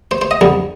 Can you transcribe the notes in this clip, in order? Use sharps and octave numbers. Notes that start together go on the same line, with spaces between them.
C5
C5
D#5
F2 D3 G3